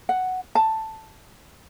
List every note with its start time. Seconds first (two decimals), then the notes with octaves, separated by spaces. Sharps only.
0.09 F#5
0.55 A5